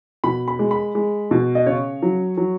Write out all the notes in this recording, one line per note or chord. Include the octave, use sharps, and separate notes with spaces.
B2 B5
B5
G#3
B5
G#3
B2
D#5
C#3 C#5
F#3
F#3